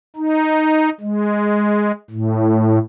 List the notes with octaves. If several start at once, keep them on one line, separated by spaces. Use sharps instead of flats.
D#4
G#3
A2